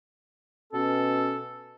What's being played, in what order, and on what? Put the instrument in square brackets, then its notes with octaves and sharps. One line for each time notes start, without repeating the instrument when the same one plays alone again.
[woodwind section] B2 C#4 A4